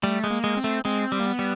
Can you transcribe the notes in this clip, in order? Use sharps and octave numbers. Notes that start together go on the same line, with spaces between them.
G3 A3
G#3
A#3
G#3
C4
A3
G#3 C4
G3
A#3
B3
G3